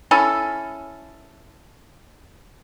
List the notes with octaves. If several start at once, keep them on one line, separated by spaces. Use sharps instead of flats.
C#4 E4 A4